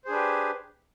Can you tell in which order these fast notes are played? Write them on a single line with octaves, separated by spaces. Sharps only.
C5 G#4 D4 B4 G4